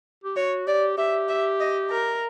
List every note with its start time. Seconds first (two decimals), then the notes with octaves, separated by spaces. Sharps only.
0.24 G4
0.36 F#4 C#5
0.67 G4 D5
0.98 G4 E5
1.29 E5
1.60 D#5
1.91 A#4